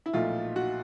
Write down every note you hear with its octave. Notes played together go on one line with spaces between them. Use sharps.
E4
B1 A#2 F3 A3 F4
F#4